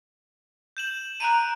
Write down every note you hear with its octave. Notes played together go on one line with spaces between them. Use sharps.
G6 E7 F#7
A#5 F#6 D7 D#7